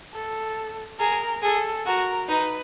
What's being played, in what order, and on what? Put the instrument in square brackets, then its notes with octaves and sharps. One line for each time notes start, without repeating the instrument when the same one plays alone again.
[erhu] A4
[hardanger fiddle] G#4 [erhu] A#4
[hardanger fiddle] G#4 [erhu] A4
[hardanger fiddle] F#4 [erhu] A#4
[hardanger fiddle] D#4 [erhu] B4